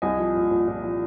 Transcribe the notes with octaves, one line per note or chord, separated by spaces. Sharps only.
C2 D#5 G#5
F3
A#2
A#2
A#2
F3